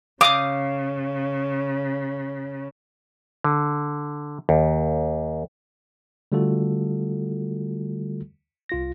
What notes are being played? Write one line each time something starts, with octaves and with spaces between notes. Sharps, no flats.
C#3 F5 D6 D#6 G6
D3
D#2
D3 G3 A3 F4 F#4 A4
C2 F4 A#6